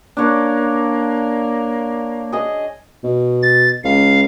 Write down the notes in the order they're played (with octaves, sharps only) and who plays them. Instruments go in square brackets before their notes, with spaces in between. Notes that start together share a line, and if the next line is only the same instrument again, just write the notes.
[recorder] A#3 [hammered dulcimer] D4 C#5
[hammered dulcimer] G#4 D#5
[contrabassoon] B2
[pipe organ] A6
[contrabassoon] C#2 [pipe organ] F5